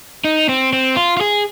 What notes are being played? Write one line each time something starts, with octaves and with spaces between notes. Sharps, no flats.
D#4
C4
C4
F4
F4
G#4